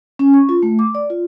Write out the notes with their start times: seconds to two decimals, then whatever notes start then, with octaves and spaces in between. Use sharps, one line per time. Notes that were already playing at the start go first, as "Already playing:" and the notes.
0.19 C#4
0.34 C#6
0.49 F4
0.63 A3
0.79 D6
0.95 D5
1.10 F4